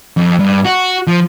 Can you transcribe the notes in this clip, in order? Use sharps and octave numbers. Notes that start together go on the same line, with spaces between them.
F2
G2
F#4
F3